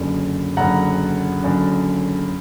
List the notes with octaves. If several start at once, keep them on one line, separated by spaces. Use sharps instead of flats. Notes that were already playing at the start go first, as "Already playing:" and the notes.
Already playing: F#1 F#2 D3
F#1 F#2 D3 F#5 A#5
F#1 F#2 D3